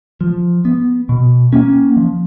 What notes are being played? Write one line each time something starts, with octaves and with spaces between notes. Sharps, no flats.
F3
B3
B2
A#3 C#4
F3